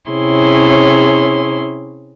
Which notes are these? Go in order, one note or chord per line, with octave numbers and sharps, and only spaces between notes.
C3 C#4 E4 G#4 C#5 C6